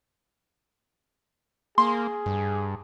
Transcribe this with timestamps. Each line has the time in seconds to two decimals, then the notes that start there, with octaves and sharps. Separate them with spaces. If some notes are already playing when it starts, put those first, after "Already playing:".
1.78 A#3 G#4 C6
2.26 G2